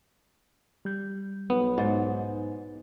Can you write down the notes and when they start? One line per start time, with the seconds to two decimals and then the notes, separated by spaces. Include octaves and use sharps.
0.85 G3 G6
1.50 B1 B3
1.78 G#2 D#4 A6